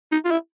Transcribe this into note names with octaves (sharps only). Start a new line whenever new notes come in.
D#4
F4
E4